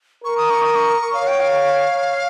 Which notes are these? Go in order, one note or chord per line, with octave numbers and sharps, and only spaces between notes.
A#4 C#6
D#6
C#6
D#6
C#6
C#5 F5
G5
F5